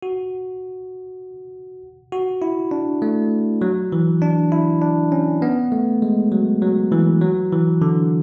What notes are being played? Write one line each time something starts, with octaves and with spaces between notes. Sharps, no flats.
F#4
F#4
E4
D4
A3
F#3
E3
D4
E4
D4
C#4
B3
A3
G#3
F#3
F#3
E3
F#3
E3
D3